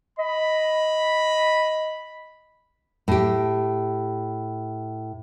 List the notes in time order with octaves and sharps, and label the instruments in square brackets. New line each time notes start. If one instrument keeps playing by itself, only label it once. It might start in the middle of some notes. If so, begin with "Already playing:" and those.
[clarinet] D#5 [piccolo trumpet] B5
[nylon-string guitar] A2 G4